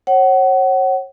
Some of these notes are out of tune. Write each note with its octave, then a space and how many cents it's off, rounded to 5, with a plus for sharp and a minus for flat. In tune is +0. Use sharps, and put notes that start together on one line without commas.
C#5 -35 F#5 +25